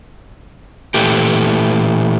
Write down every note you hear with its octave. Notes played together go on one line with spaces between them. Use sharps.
A#2 E3 A3 G4